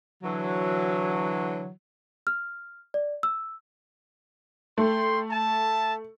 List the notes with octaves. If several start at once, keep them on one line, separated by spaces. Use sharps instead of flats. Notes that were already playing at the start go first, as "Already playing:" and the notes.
D3 E3 F#3
F6
D5
E6
A3 G5 C6
E5 A5